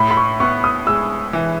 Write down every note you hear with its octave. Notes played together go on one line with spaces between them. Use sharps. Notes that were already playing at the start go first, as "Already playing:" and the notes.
Already playing: A2 B5
B5
C#6
B3 C#6
D#6
G#3 E6
E3